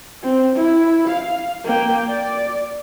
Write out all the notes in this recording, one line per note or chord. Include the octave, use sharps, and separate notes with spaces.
C4
E4
F5
A#3 G5
D5